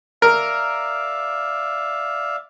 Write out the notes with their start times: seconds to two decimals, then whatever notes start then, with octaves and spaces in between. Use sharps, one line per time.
0.22 A#4 D5 E5 F5